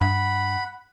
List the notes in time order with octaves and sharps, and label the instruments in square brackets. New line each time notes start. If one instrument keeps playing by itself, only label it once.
[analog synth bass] G2 [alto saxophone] F#5 [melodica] B5